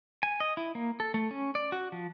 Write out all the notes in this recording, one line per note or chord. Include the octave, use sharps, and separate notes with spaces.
G#5
D#5
E4
A#3
A4
A3
C#4
D5
F#4
F3